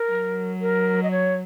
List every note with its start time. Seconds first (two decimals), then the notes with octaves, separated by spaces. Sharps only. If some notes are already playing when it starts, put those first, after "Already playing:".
Already playing: A#4
0.10 F#3
0.61 A#4
1.03 D#5
1.11 C#5